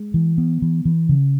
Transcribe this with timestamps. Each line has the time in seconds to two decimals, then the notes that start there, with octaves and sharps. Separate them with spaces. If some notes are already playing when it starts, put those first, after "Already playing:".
Already playing: G#3
0.14 E3
0.38 B3
0.62 E3
0.85 E3
1.09 C#3